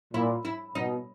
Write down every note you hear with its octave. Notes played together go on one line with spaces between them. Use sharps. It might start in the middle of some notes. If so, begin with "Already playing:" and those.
A#2 E4
E4
B2 D#4